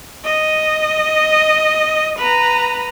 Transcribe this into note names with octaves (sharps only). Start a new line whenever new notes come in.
D#5
B4 A#5